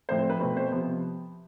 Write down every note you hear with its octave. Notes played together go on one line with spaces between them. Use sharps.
A2 F3 C4 C5
C5
B4
B2 A3 C4 B4
C5
C3 F3 B3